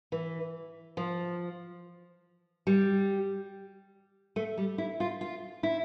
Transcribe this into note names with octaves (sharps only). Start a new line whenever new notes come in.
E3
F3
G3
A3
G3
E4
F4
F4
E4